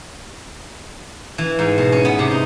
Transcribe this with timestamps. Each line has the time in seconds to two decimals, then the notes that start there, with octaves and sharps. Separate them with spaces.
1.38 E3
1.59 G#2
1.78 B2
1.92 C#4
2.05 B3
2.19 C3
2.31 D#4